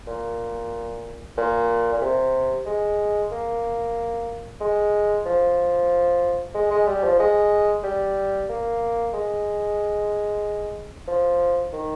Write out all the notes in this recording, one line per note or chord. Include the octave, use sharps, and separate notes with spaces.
A#2
A#2
A#2
C3
G#3
A#3
G#3
F3
G#3
G#3
G3
F3
G#3
G3
A#3
G#3
F3
D#3